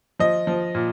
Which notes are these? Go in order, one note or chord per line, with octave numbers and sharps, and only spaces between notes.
F3 D#5
F3
A#2